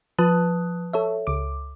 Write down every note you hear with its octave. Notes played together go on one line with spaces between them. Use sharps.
F3 B4 A5 D#6 F#6
A4 C#5 E5
C#2 D6